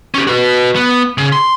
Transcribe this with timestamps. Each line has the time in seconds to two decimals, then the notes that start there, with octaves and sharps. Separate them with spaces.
0.14 C#4 G4
0.27 F#4 B4
0.76 B3
1.18 C#3
1.33 C6